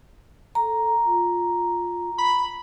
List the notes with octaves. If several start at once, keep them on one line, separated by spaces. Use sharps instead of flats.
A4 A#5
F4
B5